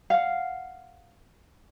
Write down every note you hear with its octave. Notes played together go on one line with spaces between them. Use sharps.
F5 F#5